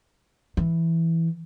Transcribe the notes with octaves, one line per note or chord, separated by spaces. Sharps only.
E3